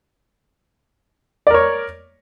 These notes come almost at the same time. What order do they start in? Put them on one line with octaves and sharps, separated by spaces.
D5 A#4 C#5